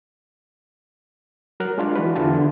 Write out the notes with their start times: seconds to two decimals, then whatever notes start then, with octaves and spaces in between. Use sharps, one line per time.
1.60 F#3 A#4 F6 F#6
1.78 G#3 D4 F4
1.96 E3 F#4 B4
2.16 E2 D3 E3 F4 G4 A5
2.34 D3